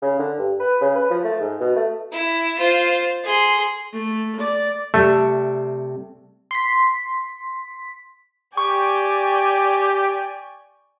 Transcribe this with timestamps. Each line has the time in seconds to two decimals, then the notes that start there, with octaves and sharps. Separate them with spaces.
0.02 C#3
0.19 D3
0.39 G2
0.60 B4
0.81 C#3
0.95 B4
1.10 F3
1.24 A3
1.40 G#2
1.60 B2
1.76 A3
2.12 E4
2.58 F4 C5
3.24 G#4 C6
3.93 A3
4.40 D5
4.94 C3 G3 A3
6.51 C6 B6
8.57 G4 D5 G5 G#5 C#6